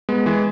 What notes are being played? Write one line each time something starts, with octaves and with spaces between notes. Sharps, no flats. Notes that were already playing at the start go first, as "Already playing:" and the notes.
G#3 B3
E3 G#3